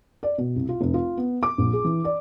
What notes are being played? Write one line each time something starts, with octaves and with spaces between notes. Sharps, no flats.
D5
B2
C2
F4
F1
F4
B3
D6
A#1
G#4
E3
D5